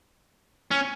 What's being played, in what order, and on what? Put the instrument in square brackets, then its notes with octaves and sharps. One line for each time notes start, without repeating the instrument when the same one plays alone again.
[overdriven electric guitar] C#4